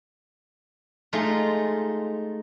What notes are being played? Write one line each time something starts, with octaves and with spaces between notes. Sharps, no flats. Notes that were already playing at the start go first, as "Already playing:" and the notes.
G#3 A3 D#4 F4